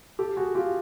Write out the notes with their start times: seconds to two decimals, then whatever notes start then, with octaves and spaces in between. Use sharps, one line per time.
0.19 G4 A4
0.37 F#4 G#4
0.55 F4 G4